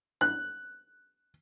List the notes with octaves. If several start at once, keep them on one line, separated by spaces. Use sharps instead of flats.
F#6